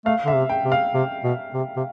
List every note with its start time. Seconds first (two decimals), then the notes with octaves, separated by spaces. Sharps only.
0.05 A3 F5
0.25 D3 E5
0.35 C3
0.49 G5
0.65 C3
0.72 F5
0.94 C3
1.24 B2
1.54 C3
1.77 C3